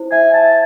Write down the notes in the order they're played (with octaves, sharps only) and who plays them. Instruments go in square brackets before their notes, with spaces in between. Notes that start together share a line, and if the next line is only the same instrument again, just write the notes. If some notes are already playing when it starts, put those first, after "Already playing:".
Already playing: [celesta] E4 C5
[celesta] E5 [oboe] G#5
[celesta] E5 [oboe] A5